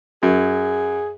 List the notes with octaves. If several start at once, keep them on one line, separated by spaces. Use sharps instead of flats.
F#2 G#4